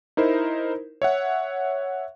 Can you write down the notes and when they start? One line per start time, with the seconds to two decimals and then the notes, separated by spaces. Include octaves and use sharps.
0.17 D#4 E4 A#4 C5
1.02 C#5 E5 F#5